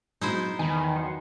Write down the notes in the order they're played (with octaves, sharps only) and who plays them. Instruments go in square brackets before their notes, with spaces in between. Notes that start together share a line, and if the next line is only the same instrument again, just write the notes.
[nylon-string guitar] F#3 G#3 B3 [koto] D#4 E4 C5
[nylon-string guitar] E2 [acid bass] D#3 [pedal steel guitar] G#5 B5
[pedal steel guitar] F#3 F#5 C6